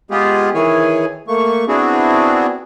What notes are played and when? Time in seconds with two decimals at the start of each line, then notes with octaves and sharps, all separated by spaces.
0.11 G#3 B3 F4 G4 G#4
0.54 D#3 E3 E4 G#4 C#5 G#5
1.28 A3 A#3 C#6
1.68 B3 C4 D4 E4 F#4 G#4